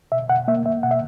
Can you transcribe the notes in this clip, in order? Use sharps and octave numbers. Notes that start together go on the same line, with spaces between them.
B2 E5
B2 F#5
A#3 E5
A#3 E5
B2 F#5
E5